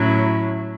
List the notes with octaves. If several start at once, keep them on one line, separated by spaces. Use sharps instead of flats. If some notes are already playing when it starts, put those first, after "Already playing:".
Already playing: A2 F#3 C#4 E4